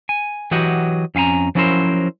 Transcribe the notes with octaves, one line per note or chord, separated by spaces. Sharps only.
G#5
E3 F#3 F#4 G4 D#5 F#5
F2 C#4 F5 G#5 A#5
F3 F#3 C#4 E4 A#4 C5